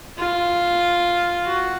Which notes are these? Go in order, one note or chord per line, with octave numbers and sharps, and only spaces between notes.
F4
F#4